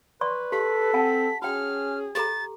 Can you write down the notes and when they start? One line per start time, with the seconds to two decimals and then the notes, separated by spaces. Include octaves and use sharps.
0.21 B4 D5 C6 C#6
0.52 G4 A4 B6
0.94 C4 F#5 G#5 A5
1.42 C#4 F#4 G#4 G5 F6
2.15 G4 A4 A#5 A6